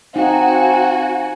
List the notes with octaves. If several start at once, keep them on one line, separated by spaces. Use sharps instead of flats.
C4 D#4 F#4 F5 G#5